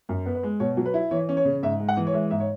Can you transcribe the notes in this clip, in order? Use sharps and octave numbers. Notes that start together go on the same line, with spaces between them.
F#2
B3
B4
G#3
B2 C#5
F#3
B4
E4
E3 C#5
C#4
C#5
C#3
G#2 E5
G#3
F#5
E3
C#5
G#3 E5
G#2 E5
C#5